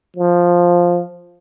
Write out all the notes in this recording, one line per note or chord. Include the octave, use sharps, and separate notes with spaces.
F3